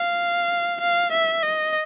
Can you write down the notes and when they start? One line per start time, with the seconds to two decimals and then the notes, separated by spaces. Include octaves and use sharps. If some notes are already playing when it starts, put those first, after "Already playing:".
Already playing: F5
0.80 F5
1.11 E5
1.42 D#5